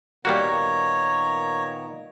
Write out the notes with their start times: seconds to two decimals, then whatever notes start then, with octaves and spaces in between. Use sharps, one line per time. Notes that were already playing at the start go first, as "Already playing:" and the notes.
0.25 A#2 D#3 G3 A#3 B3 F#4 C#5 A#5